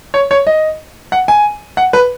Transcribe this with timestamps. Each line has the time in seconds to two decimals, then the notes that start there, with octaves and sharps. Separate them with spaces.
0.14 C#5
0.31 C#5
0.47 D#5
1.12 F#5
1.28 G#5
1.77 F#5
1.93 B4